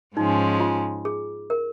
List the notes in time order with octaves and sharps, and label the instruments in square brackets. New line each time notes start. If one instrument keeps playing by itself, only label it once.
[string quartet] G#2 F3 G#3 C#4 [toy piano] D#4
[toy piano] F4
G#4
A#4